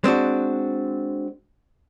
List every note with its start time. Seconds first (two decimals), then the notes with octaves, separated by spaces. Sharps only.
0.04 G#3 C4 D4 F#4